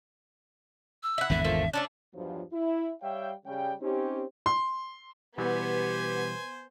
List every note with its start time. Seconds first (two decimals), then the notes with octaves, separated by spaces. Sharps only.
1.03 E6
1.18 E4 F#5
1.30 G#1 E2 D3 E5
1.44 F3 A3 A#3
1.73 A3 C#4 D4 D5
2.14 E2 G2 F3 F#3
2.53 E4
3.02 G3 C#5 E5 F5 G5
3.46 C#3 G3 G5
3.81 C4 C#4 D#4 G4
4.46 C6
5.38 B2 E3 G3 B3 G4 C5 G#5